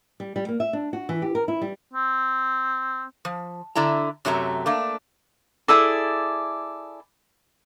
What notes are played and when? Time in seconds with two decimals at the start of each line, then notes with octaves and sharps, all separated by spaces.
0.20 G3
0.36 G3
0.49 A#3
0.60 E5
0.73 D4
0.93 F#4
1.09 E3
1.22 G4
1.35 A#4
1.48 E4
1.61 G3
1.94 C4
3.25 F3
3.75 D3 D4 E4 A#5
4.25 F#2 C3 F#3 A3 A#5
4.66 A3 A#3 D4
5.68 E4 G#4 A4 D5